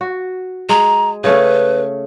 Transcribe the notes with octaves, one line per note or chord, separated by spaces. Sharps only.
F#4
G#3 A#5
C#3 A3 C#4 B4